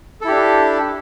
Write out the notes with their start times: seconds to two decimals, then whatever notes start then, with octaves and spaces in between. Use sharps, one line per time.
0.21 A4
0.24 E4
0.28 G4
0.31 D4